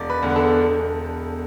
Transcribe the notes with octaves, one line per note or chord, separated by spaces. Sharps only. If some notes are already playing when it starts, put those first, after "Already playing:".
Already playing: E1 D5
B4
E2 D3 B3
A4
E1